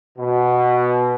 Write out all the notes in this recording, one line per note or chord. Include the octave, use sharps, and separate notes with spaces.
B2